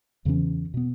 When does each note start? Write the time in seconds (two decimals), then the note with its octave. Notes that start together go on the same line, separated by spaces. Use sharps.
0.25 E2 C#3 E3 C#4
0.74 B2 B3